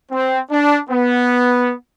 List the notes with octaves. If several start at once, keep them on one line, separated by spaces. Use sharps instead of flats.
C4
D4
B3